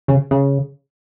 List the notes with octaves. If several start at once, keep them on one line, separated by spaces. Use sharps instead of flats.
C#3
C#3